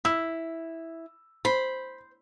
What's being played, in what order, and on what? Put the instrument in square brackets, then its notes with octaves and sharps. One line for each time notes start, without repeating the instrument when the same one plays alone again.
[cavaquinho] E4 [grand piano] E6
[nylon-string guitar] C5 [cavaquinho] B5